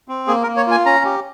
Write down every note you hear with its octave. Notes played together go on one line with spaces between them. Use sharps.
C4
A#3 G#4
A#4
A#3
C#5
F4 G#5
C#4 A#5
G4